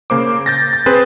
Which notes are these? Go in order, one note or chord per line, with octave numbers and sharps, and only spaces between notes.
C#3 A#3 C5 D6
G6 A6 A#6
A6
C4 G#4 B4 C5